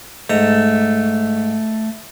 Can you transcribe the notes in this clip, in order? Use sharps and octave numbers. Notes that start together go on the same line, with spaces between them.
G#2 A3 A#5